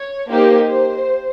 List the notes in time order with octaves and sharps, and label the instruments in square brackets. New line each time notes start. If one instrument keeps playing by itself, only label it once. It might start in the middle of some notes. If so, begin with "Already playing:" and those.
Already playing: [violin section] C#5
A#3 D#4 G4 C5
C5